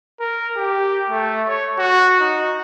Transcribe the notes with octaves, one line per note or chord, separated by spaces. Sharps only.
A#4
G4
A3
C#5
F#4
D#4